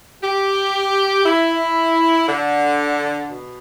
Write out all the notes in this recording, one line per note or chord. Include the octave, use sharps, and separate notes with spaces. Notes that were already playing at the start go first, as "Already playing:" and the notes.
G4
E4
D3
B2